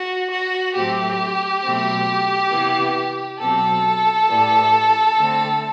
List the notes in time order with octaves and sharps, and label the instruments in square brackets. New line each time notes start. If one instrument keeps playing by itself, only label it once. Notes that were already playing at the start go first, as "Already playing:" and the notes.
Already playing: [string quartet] F#4
F#4
A2 F#3 A3 C4 G4
B2 F#3 A3 C4
C3 E3 B3
B2 F#3 C4 A4
A2 E3 G3
D3 A3 C4